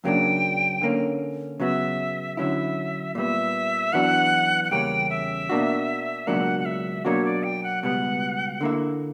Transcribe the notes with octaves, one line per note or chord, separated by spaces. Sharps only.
F#2 C#3 F#3 A#3 D4 G5
D3 A#3 C#4
C#3 F#3 B3 F#4 E5
D3 F#3 C#4 E4 E5
A#2 G3 B3 E5
F#2 E3 B3 D4 F#4 F#5
F#5
E2 C#3 G3 A#3 C#4 G5
E5
B2 A#3 D4 F#4
C#2 B2 F#3 A#3 D4 F#5
F#5
E5
B2 F#3 A#3 D4 F#4 C#5
D5
G5
F#5
C#2 B2 G3 B3 F#5
D3 A#3 E4